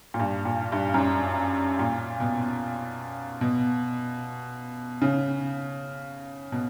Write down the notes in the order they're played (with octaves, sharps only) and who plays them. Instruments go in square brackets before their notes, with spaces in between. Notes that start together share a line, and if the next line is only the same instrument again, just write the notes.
[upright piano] A#2
G2
A#2
G2
F#2
G2
A#2
B2
B2
C#3
B2